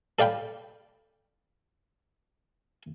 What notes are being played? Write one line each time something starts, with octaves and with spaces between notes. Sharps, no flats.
A4 D5 F5 G5 B5